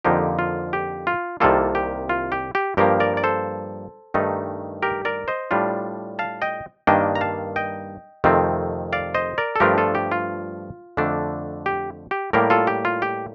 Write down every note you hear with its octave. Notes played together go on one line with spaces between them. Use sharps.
F2 D3 F3 A#3 D#4 G4
F4
G4
F4
C2 C3 D#3 G3 A#3 F4 A4
G4
F4
G4
G4
G2 F3 A#3 G4 A#4
A#4 D5
D5
A4 C5
G2 D#3 A3 D#4
G4 A#4
A#4 D5
C5 D#5
A2 G3 D4 F4
F5 A5
D#5 G5
G2 D#3 A#3 D4 D#5 G5
A#5
F5 A5
D#5 G5
F2 C3 D#3 A3 C4
D5 F5
C5 D#5
A#4 D5
A4
G2 F3 A3 D4 F4 G4 A#4
F4 A4
G4
F4
F2 D3 A3 D4
G4
G4
A2 G3 A#3 G4 A#4
F4 A4
G4
F4
G4